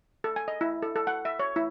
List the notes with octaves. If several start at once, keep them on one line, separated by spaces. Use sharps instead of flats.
A4
G#5
D#5
E4
A4
A4
F#5
E5
C#5
E4